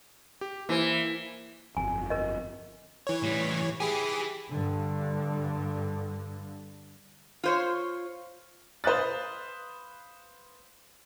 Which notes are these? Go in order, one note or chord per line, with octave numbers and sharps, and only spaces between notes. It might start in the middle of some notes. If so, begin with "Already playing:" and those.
G4
E3 A#3 E4 C5
G1 F2 G#5
A#4 D#5
E3 C#5
A2 G3
E4 G4 G#4 G#5
G2 D3
F4 C5 C#5
B4 C5 F5 D#6 F#6 A6